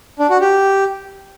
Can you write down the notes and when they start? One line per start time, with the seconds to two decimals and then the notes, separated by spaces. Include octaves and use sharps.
0.19 D4
0.30 F#4
0.41 G4